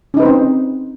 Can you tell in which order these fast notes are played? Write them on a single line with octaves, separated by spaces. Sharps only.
C#4 D#4 B4 C5 C4